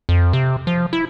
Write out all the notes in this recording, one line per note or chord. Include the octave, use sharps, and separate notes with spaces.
F2
C3
F3
E4